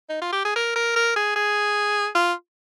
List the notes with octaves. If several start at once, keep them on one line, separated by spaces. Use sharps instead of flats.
D#4
F4
G4
G#4
A#4
A#4
A#4
G#4
G#4
F4